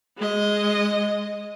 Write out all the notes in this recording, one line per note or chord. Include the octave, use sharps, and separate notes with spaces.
G#3 D#5